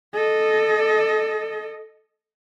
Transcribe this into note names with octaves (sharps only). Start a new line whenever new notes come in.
A4 D#5